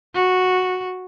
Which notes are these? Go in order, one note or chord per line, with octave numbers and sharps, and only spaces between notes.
F#4